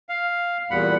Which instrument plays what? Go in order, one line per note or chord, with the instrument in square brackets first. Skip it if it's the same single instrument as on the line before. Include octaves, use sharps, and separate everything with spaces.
[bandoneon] F5
E2 A#2 G3 F#5 B5